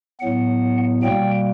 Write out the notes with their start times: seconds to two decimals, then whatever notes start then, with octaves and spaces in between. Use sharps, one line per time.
0.20 A2 F#3 B3 F#5
1.02 B2 G3 A#3 G5